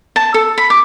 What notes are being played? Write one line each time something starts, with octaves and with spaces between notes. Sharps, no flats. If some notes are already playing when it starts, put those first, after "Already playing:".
A5
A4
B5
D6